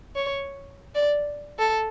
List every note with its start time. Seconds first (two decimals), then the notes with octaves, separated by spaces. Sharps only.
0.16 C#5
0.95 D5
1.59 A4